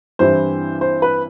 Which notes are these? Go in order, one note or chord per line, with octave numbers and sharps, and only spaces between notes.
G2 E3 G3 C4 E4 C5
C5
B4